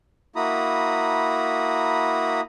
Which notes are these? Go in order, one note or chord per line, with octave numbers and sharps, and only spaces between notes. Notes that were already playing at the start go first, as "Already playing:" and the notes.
A#3 E4 F#4 A#5 B5 D#6